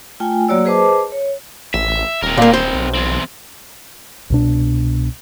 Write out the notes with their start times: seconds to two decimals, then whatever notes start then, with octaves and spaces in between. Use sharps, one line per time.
0.20 A3 F4 G5 G#5
0.49 F#3 A#3 F#4 C#5 D5 E6
0.65 G#4 B4 C5 D#5 A5 D6
1.12 C#5
1.74 A1 E5
2.22 D#1 C4 A#4
2.38 A#2 A#3
2.54 C5
2.75 B1
2.95 E2 C4
4.30 C2 B2 D4